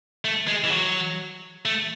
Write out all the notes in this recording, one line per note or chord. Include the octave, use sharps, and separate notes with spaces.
A3
G#3
E3
F#3
A3